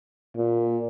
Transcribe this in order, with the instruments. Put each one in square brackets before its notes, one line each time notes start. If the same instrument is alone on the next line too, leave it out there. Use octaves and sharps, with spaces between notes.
[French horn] A#2